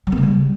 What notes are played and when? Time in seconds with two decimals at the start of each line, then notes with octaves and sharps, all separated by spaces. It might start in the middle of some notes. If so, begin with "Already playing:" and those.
0.07 F#3
0.12 B3
0.18 C#3
0.23 G3